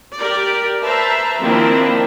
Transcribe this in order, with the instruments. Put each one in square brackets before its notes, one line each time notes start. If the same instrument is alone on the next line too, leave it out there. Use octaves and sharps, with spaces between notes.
[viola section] G4 A#4 D5
B4 C5 E5 A5 A#5
D#3 F3 A#3 C4 D4 E4